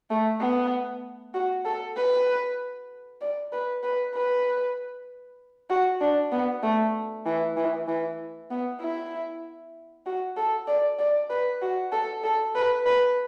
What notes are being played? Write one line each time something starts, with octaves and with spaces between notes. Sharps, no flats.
A3
B3
F#4
A4
B4
D5
B4
B4
B4
F#4
D4
B3
A3
E3
E3
E3
B3
E4
F#4
A4
D5
D5
B4
F#4
A4
A4
B4
B4